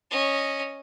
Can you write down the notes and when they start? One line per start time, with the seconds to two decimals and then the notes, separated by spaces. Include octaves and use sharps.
0.11 C#4 D#5